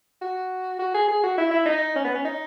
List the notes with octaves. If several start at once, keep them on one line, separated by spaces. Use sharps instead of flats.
F#4
F#4
G#4
G#4
F#4
E4
E4
D#4
C#4
B3
C#4
D#4